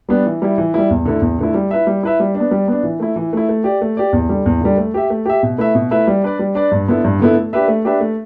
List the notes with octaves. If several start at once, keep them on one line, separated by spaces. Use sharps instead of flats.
G3 B3 D4
E3
G3 E4
E3
G3 E4
E2
D3 A3 E4
E2
D3 A3 E4
G3
E4 B4 E5
G3
E4 B4 E5
G3
D4
B3
G3
B3 D4
E3
A3 E4
E3
A3 E4
A3
G4 D5
A3
G4 D5
E2
D3 G3
E2
D3 G3
A3
G4 E5
A3
G4 E5
B2
A3 E4 B4 E5
B2
A3 E4 B4 E5
G3
D4 B4 D5
G3
D4 B4 D5
G2
D3 B3 E4 A4
G2
D3 B3 E4 A4
A3
D4 G4 B4 E5
A3
D4 G4 B4 E5
A3